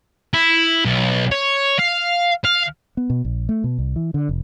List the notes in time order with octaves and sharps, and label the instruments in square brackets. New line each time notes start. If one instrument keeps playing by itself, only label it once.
[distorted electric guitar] E4
B1
C#5
F5
F5
[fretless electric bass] B3
B2
A#1
A3
B2
C2
E3
D3
F1